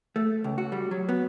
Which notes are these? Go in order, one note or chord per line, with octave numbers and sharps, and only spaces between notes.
A3
C#2
F#4
G3
F#3
B3